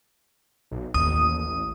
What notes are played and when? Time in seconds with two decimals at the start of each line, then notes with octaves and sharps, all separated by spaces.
0.71 B1
0.94 A1 D#2 D#6